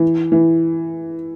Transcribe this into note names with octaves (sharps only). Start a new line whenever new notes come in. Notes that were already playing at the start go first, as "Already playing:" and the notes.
Already playing: E3
E3